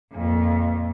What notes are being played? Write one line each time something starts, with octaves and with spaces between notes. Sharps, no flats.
F2 A#2